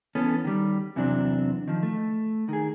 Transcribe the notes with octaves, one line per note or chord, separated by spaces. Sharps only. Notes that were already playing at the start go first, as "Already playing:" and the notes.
E3 B3 C#4 A4
D#3 G3
E2 C3 E3 F#3 C4 D4
D#3 F3
A3
D#3 G#4